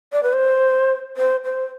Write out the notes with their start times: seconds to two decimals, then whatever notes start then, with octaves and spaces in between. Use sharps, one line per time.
0.13 D5
0.23 B4
0.33 C5
1.17 C5
1.45 C5